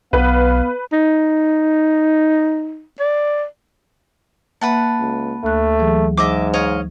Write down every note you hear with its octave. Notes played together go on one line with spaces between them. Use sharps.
B1 B3 B4 F5
D#4
D5
A#3 B4 E5 F#5 A5
C#2
D2 A3 F#6
E3 F#3 G#4
G#2 D#5 E5 D6
C#5 D#5 F5